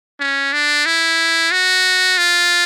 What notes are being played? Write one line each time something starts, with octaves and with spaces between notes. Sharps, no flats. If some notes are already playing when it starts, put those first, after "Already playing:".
C#4
D4
E4
F#4
F4